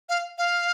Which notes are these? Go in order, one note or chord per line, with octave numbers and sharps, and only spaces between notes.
F5
F5